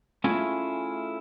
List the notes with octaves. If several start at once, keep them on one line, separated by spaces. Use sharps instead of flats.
A3 C#4 E4 F4 G#4